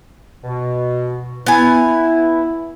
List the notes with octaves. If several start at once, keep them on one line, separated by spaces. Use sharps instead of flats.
B2
B3 E4 G#5